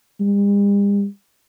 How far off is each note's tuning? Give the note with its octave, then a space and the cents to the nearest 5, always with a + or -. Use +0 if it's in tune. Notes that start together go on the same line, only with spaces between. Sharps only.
G3 +45